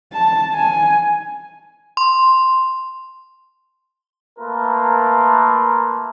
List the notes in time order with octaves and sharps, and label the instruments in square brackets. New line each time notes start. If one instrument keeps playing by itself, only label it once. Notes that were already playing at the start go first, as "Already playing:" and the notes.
[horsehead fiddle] A5
G#5
[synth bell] C6
[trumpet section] A3 A#3 F4 A#4 B4